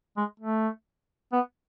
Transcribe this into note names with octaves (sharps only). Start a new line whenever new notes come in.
G#3
A3
B3